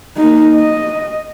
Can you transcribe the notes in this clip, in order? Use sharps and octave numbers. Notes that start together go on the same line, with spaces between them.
A#3 D#4
D#5